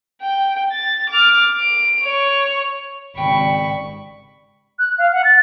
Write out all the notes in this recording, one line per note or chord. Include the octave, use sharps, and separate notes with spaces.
G5
A6
D6 F6
D7
C#5
G#1 C#3 G3 G5 B5 C#6
F#6
F5
F#5
A6